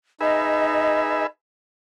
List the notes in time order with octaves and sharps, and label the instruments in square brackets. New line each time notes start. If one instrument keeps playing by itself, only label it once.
[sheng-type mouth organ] D#4 [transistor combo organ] G#4 B4 E5 [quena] D#5